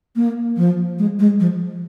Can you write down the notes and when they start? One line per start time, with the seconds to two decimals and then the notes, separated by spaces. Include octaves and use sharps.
0.16 A#3
0.57 F3
0.98 G#3
1.19 G#3
1.40 F3